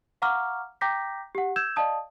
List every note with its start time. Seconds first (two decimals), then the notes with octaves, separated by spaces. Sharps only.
0.22 F5 F#5 A#5 C#6 D6 F6
0.81 G5 A#5 D6 G6 A#6 B6
1.35 G4 F#5
1.56 E6 G6 G#6 E7
1.76 D5 D#5 F5 A5 D#6